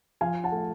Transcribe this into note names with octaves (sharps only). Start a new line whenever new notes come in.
F3 F5 G#5
F#5 A5
A3